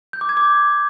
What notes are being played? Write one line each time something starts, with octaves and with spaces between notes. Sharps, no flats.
G6
D6
G#6
D6